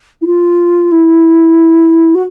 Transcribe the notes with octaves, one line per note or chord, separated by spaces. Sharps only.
E4
F4
E4
F#4